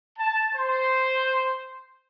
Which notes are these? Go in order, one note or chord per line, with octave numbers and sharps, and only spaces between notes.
A5
C5